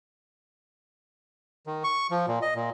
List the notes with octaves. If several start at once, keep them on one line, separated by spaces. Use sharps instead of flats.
D#3
C#6
F3
A#2
D#5
A#2